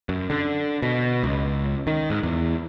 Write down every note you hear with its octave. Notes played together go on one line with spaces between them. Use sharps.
F#2
D3
B2
C#2
D#3
G#2
E2